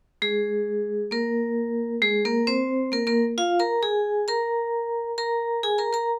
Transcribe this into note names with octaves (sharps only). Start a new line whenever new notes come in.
G#3 G#4
A#3 A#4
G#3 G#4
A#3 A#4
C4 C5
A#3 A#4
A#3 A#4
F4 F5
A#4 A#5
G#4 G#5
A#4 A#5
A#4 A#5
G#4 G#5
A#4 A#5
A#4 A#5